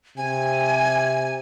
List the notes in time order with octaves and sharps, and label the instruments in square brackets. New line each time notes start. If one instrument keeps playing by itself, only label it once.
[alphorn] C3 [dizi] G#5